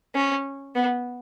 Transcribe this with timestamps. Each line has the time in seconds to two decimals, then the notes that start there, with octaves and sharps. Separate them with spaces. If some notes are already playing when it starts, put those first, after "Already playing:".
0.15 C#4
0.75 B3